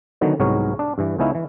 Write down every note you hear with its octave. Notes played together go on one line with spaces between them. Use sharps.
D3 D#3 F#3 B3
C2 G#2 F#3 B3 A#4 C#5
D4
G2 E3
C#2 B3 C#4 D#4 E4 F5
E3